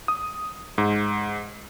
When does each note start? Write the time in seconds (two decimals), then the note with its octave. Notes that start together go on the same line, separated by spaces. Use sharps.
0.08 D#6
0.78 G#2